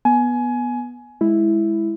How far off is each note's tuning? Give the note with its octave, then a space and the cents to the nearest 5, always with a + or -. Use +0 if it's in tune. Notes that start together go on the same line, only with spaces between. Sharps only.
B3 -15 G#5 +20
G#3 +5 E4 +0